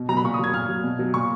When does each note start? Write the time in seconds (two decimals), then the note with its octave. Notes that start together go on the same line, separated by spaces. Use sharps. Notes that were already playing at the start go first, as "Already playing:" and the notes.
Already playing: B2
0.09 F#3 A#5
0.17 B5
0.23 A#2 C#6
0.34 D#6
0.39 F#3 G#6
0.53 A#2 F6
0.69 F#3
0.84 B2
0.99 F#3
1.14 A#2 C#6